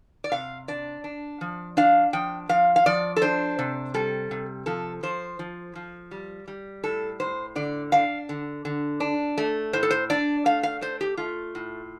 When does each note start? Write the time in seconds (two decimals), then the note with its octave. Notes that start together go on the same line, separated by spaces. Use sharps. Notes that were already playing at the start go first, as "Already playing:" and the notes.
0.24 D5
0.32 C3 F5
0.68 D4 D5
1.04 D4
1.41 F3
1.77 D4 F5
2.13 F3 G5
2.49 F3 F5
2.76 F5
2.86 F3 D5
3.16 A4
3.22 D4 C5
3.59 C3
3.94 G3 A4
4.31 C3
4.66 F3 A4
5.03 F3 C5
5.39 F3
5.75 F3
6.11 G3
6.48 G3
6.84 A2 A4
7.20 A2 C5
7.56 D3 D5
7.92 D4 F5
8.29 D3
8.65 D3
9.00 D4
9.38 A3
9.73 A2 C5
9.83 A4
9.91 C5
10.10 D4 D5
10.45 A3 F5
10.63 F5
10.81 A3 C5
11.01 G4
11.17 A3 F4
11.55 A2